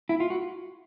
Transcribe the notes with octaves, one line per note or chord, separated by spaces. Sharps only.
E4
F4
F#4